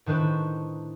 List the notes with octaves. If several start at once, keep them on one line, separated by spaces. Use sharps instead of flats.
A2 D#3 D4 B4 C5 C#6